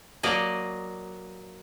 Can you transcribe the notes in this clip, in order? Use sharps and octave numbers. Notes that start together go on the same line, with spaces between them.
F#3 A#3 D5 D#5